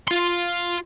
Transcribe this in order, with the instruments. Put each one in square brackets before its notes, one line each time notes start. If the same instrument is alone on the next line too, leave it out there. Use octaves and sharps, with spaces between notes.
[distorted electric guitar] F4 C6